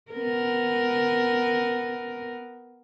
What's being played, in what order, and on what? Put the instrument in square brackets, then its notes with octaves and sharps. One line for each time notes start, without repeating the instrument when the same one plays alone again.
[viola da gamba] B3 A#4